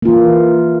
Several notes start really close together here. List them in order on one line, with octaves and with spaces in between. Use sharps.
A#3 F4 E3